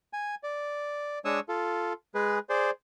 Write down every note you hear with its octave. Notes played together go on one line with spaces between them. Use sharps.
G#5
D5
G#3 D4 C#5 C#6 D#6 E6
F4 A4
G#3 G#4 B4
G#4 C5 D5